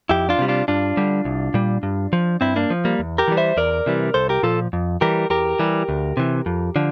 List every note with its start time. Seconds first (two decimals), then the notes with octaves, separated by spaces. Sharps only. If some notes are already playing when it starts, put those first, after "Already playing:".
0.09 F2 E4 G4
0.29 D4 F4
0.39 C3 G3
0.48 D4 F4
0.68 G2 D4 F4
0.97 D3 G3
1.25 C2
1.54 A#2 G3
1.83 G2
2.13 F3
2.41 G2 C4 E4
2.56 A#3 D4
2.70 F3
2.85 G3 A#3
2.99 E2
3.18 G4 A#4
3.28 E3 G3
3.37 C5 E5
3.57 E2 A#4 D5
3.86 C3 E3 G3
4.14 C2 A4 C5
4.29 G4 A#4
4.43 A#2 F3 F4 A4
4.73 F2
5.01 E3 G3 G4 A#4
5.30 E2 G4 A#4
5.59 E3 G3
5.89 D2
6.17 C3 E3
6.46 F2
6.76 D3 F3